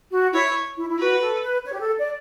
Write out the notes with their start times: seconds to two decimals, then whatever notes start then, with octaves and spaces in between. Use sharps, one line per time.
0.11 F#4
0.33 E4 C#5
0.77 E4
0.89 E4
0.98 F#4 B4
1.21 A4
1.42 B4
1.65 C#5
1.73 G4
1.80 A4
1.97 D5